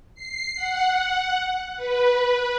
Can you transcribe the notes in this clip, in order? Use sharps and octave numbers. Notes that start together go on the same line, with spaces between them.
C7
F#5
B4